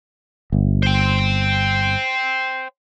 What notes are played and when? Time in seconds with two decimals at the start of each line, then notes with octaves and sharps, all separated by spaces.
0.52 G1
0.83 C5 G5